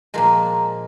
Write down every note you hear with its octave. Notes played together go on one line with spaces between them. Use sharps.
A#2 F3 G#3 A#4